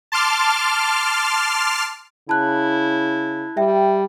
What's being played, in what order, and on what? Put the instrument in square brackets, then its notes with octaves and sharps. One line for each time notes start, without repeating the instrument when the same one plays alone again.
[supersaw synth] A5 C6 D6 F6
[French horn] C#3 [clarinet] E4 [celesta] A5 F#6
[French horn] G3 [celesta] E5 G5